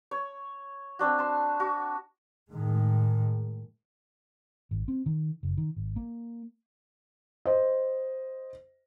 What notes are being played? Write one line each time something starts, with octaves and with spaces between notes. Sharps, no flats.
C#5
C4 D4 F#4
A5 C6
F#4
A2 D#3 G#3
G#1
C4
D#3
F#1
D#3
G#1
A#3
C5 D#5